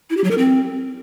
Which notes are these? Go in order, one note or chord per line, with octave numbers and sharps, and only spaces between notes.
E4
G4
F#3
A#4
C4